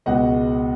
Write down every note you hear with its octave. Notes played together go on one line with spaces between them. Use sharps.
C#2 B2 G#3 B3 D#5 F#5